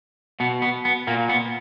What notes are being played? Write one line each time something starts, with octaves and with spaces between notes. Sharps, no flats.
B2 B3
B3
B3
A#2 A#3
B3